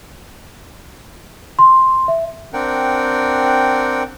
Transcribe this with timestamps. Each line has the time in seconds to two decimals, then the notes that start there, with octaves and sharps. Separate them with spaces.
1.59 C6
2.08 E5
2.53 C4 D4 A#4 F#5 G5